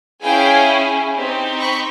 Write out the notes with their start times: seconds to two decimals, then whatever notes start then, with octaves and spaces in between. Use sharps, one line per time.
0.22 C#4 E4 G#4 F5 G5
1.15 C4 D#4 G4
1.60 B5 C#6